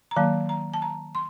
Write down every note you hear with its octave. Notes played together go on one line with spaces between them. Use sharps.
A#5
D#3 F#3 A#3 A5
A#5
A5
A#5
C6